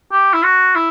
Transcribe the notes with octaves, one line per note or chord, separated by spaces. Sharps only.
G4
E4
F#4
E4